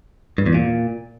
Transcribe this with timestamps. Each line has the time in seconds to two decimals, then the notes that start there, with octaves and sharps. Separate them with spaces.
0.38 G2
0.46 E2
0.54 A#2